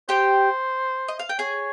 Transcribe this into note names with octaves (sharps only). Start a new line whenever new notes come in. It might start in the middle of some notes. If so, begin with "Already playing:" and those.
G4 C5 G5
D#5
F5
G5
G#4 C#5 G#5